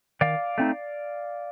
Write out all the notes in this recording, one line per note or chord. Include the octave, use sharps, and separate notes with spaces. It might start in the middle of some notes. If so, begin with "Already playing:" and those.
D#3 D5 F5
A3 C4 D#4